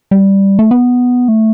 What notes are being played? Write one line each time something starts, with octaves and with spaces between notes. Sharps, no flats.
G3
A3
B3
A3